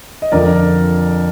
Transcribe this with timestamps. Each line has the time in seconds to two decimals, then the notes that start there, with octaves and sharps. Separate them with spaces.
0.22 D#5
0.32 F2 D3 F3 A#4 D5